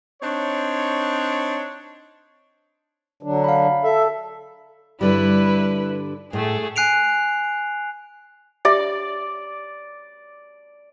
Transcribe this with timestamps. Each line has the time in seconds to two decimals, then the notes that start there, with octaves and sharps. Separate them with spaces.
0.22 C4 D4 D#4 C#5
3.23 D3 F#3 D4
3.44 F5 B5
3.83 A4 E5
5.01 G2 D3 G3 E4 B4
6.33 A2 A3 G#4
6.76 G#5 F#6 C7 D7 F7
8.65 G4 D5 E5